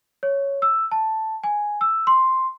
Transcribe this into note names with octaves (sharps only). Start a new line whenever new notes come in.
C#5
E6
A5
G#5
E6
C6